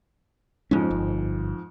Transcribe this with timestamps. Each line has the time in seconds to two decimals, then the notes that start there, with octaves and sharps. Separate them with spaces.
0.71 F2 G#2 G#3 C#4
0.91 G1